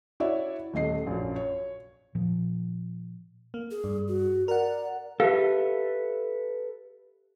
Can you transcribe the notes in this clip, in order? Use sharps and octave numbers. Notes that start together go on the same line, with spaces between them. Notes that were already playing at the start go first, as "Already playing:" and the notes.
E4 F#4 C#5 D5 E5
D#1 A3 D#5 C7
A#1 F#2
C#5
A#2 F3
A#3
G#4
G2
F#4
A#4 D5 F#5
G4 A4 B4 E5 F5